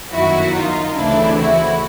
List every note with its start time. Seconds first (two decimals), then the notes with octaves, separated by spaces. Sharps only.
0.11 G1 F#2 D#3 E4 F#4
0.53 D#4 F4
0.95 D2 C#3 E3 A3 C4 D4 E4
1.37 E4 F#4